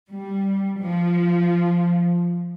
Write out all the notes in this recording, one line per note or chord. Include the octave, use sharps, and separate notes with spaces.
G3
F3